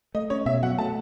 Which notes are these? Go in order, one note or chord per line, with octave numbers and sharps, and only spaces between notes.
A3 D#5
C#4 C#5
B2 E5
F#3 F#5
A3 A5